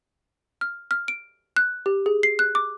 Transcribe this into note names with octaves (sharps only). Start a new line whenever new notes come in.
F6
F6
D7
F#6
G4
G#4
C7
F#6
D6